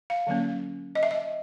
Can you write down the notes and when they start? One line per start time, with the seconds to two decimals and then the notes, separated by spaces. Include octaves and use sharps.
0.10 F5
0.27 D3 F#3 A#3 C#4
0.95 D#5
1.03 E5
1.11 D#5